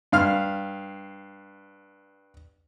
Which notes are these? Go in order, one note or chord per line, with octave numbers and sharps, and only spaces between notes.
G2 F5 F6